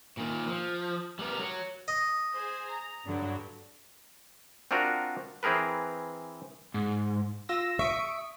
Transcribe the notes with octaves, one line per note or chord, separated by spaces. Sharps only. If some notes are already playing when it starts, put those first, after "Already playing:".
A#2 D#3
F3
G3 B3 A#4
F#3
D#5
G#4 C5
A#5
G2 D3 F#3
C4 D4 F4 F#4 A#4
E3 C4 G#4 A#4 B4
G#2
F4 E6 A#6
E5 C#6 D#6 D7